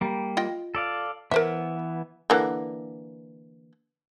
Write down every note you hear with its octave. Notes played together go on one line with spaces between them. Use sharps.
G3 A#3
F4 D#5 G5
A4 D5 F5
E3 B3 A#4 C5 E5
D3 E3 A#3